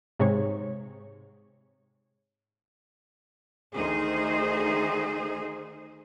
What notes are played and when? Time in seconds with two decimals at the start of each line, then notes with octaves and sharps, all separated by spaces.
0.20 G#2 C3 G#3 C#5
3.74 D2 D#3 D#4 G#4 C5